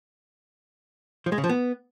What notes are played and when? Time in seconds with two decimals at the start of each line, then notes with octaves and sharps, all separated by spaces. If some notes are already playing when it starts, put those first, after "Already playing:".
1.26 F3
1.32 G#3
1.38 C#3
1.44 F3
1.49 B3